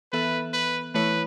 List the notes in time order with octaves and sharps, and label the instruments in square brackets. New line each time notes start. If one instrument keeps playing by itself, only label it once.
[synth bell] E3 B3 A4 E5 [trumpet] B4
[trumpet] B4
[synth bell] E3 A3 E4 C#5 [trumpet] B4